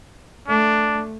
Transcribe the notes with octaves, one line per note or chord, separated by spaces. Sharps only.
A3 D4